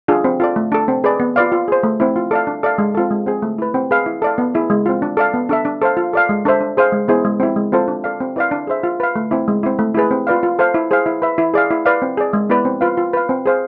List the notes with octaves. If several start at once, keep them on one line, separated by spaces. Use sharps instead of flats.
D4 F4 G#4
C4
F4 A4 D5
A3
D4 A4
C4
G#4 B4 D5
B3
F4 B4 D5 F5
F4
G#4 C5
A3
C4 E4
F4
A4 D5 F5
D4
A4 D5 F5
G#3
C4 F4 A4
G#3
C4 G#4
A3
E4 B4
C4
G#4 B4 F5
E4
A4 D5 F5
B3
E4 G#4
G#3
C4 F4
D4
A4 D5 F5
B3
D4 A4 E5
D4
A4 C5 F5
F4
A4 D5 F5
G#3
D4 A4 C5 E5
D4
G#4 C5 F5
G#3
B3 E4 G#4 C5
G#3
C4 E4
G#3
C4 F4 A4 C5
D4
A4 D5 F5
C4
E4 B4 D5 F5
D4
G#4 C5 E5
F4
B4 F5
A3
C4 E4
G#3
C4 E4
A3
E4 G#4 B4
C4
F4 B4 D5 F5
F4
A4 C5 F5
E4
G#4 C5 F5
E4
B4 E5
E4
G#4 D5 F5
E4
B4 D5 F5
C4
G#4 D5
G#3
B3 E4 B4 D5
C4
F4 B4 F5
F4
B4 F5
C4
G#4 C5 F5